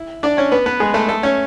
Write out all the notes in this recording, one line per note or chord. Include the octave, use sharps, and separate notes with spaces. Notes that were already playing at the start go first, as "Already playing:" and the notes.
Already playing: E4
D4 D5
C#4 C#5
B3 B4
B3 B4
G#3 G#4
A3 A4
A3 A4
C#4 C#5